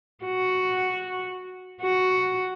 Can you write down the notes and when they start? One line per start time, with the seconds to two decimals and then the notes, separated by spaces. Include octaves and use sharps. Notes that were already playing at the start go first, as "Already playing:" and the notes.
0.25 F#4
1.82 F#4